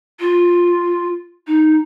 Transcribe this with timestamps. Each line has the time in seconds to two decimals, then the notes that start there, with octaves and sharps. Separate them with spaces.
0.20 F4
1.47 D#4